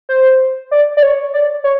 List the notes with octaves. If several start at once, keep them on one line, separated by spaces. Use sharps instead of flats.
C5
D5
D5
C#5
D5
C#5